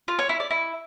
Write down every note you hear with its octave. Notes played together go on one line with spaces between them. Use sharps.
F4
C#5
E4
D5
E4